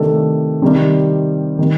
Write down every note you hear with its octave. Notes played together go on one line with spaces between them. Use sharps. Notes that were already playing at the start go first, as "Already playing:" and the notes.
Already playing: C3 D#3 A3 D4 A4
C3 D#3 G3
D#3 G3